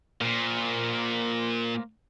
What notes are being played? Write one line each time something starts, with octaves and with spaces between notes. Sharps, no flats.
A#2 A#3 C5